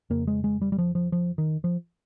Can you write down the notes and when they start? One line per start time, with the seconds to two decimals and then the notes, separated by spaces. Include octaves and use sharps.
0.10 F2 C#3 A#3
0.27 G#3
0.44 G#3
0.62 G3
0.72 G3
0.78 F3
0.95 F3
1.12 F3
1.38 D#3
1.64 F3